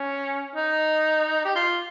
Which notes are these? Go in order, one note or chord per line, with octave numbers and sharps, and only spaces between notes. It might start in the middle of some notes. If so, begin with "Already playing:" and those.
Already playing: C#4
D#4
G4
F4